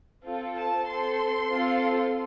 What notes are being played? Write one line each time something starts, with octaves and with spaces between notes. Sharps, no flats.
C4 F4 A4
A5
C4 A4 C6
C4 F4 A4